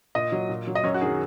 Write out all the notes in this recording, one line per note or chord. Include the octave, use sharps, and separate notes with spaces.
A#2 D#5
F#3
A#2
F#3
D#5
F#2 C#5
F#4
D#3 F#3 G#4